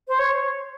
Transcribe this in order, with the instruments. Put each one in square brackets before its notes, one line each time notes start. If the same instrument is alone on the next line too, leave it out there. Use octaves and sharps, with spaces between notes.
[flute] C5
C#5